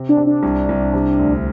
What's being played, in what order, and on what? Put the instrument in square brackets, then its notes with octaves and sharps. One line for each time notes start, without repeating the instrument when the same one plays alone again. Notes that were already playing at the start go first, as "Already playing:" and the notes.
Already playing: [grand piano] C3
[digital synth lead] D4
[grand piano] C3
[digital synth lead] D4
[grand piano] C2
C2
C3
D2